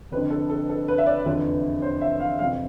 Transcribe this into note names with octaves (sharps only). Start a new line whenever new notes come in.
F1 F2 D3 B4
A4
A4
A4
B4
E5
D5
F1 E2 D3 F3
C5
E5
F5
F1 F2 C3 F3 F5